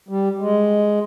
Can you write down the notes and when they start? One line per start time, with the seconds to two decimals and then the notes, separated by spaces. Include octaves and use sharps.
0.09 G3
0.40 G#3